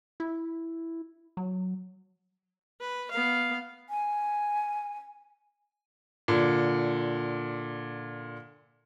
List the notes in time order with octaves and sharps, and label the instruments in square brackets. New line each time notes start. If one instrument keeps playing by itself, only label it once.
[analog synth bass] E4
F#3
[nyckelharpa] B4
B3 F5
[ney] G#5
[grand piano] A#2 D3